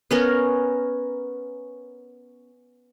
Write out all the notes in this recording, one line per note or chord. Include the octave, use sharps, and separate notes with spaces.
B3 C#4 A#4